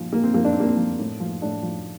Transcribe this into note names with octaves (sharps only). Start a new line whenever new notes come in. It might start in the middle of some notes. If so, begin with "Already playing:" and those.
Already playing: A#2 F3
A#2 A#3
C4
F3 A#3
D4
C4
A#2 A#3
C4
F3
A2
F3
A2 D4
F3